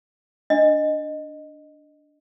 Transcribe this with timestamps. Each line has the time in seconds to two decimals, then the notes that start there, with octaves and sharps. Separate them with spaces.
0.50 D4 D#5